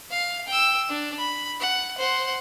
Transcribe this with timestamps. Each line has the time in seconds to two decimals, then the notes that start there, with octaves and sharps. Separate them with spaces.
0.11 F5
0.48 G5 E6
0.89 D4
1.18 B5
1.60 F#5
1.98 C5 F#5